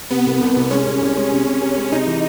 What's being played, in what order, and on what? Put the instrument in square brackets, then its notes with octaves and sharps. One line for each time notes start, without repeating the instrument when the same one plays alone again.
[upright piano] C3 [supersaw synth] B3
[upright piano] C2
C2
C2
[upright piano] G#3 [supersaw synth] C#4
[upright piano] C2
C2
G#3
C3
C3
C3
G#3
[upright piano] C3 [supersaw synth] D#4
[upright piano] E3